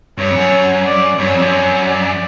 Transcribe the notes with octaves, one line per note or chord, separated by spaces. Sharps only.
G2 C#5
F2
F#2
D5
G2 C#5
F#2
F2
F#2
C#5
D5